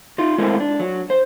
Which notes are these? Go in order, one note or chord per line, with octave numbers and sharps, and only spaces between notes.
D#4 F4
G#3 A3 C4 E4 A#4
D4
F#3
C5